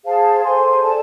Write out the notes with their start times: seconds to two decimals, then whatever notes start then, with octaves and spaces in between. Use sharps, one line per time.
0.04 G#4 C5 F5 A5
0.43 A4 C5 G#5 C6
0.83 A4 D5 A5